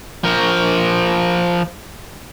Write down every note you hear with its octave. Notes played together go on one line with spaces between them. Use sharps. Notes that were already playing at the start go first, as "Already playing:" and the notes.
F3 A#4